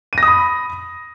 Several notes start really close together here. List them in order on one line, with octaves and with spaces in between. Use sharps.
D#7 A#6 D#6 B5